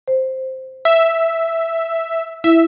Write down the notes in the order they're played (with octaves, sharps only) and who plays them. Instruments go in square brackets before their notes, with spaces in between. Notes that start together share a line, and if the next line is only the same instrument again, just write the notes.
[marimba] C5
[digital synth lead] E5
[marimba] E4 [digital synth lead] E5